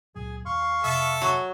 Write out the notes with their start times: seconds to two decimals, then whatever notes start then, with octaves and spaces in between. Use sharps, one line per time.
0.15 C#2 A#2 F#3 G#4 G#5
0.46 D#2 F5 C6 C#6
0.84 F2 C3 A4 E5
1.22 F#3 C#6